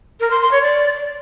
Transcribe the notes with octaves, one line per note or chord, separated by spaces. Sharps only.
A#4
C6
C6
C#5
D5